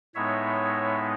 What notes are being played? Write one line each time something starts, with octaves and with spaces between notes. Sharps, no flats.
A2 G#3 B3 D#4 C#5 E5